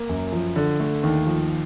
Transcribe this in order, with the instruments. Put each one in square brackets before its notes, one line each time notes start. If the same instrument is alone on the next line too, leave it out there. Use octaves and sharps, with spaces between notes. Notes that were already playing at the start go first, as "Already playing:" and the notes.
Already playing: [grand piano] A#3
F#2
F3
D3
A3
D#2
F3